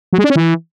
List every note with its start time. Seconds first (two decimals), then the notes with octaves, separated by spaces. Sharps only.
0.13 F#3
0.18 G#3
0.24 D4
0.30 C#4
0.36 E3